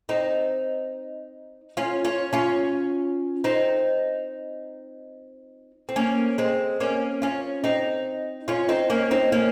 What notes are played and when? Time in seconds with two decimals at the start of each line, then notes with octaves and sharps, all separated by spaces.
0.09 C4 D#4
1.77 C#4 F4
2.05 C#4 F4
2.33 C#4 F4
3.44 C4 D#4
5.89 C4
5.96 A#3 C#4
6.38 G#3 C4
6.80 A#3 C#4
7.22 C#4 F4
7.64 C4 D#4
8.48 C#4 F4
8.69 C4 D#4
8.90 A#3 C#4
9.11 C4 D#4
9.32 A#3 C#4